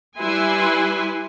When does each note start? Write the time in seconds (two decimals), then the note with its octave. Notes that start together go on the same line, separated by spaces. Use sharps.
0.17 G3 E4 B4 G#5 C6